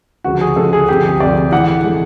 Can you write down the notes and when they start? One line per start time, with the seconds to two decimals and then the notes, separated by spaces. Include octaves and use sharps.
0.24 D2 C#3 F3 G#3 F#4
0.41 G#4
0.56 D2 C#3 F3 G#3 A4
0.73 G#4
0.88 D2 C3 F3 G4
1.05 G#4
1.20 D2 C3 F3 D5
1.52 A2 E3 G#3 F#5
1.84 A2 E3 G#3